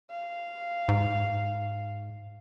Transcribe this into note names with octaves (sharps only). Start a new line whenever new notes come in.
F5
G#2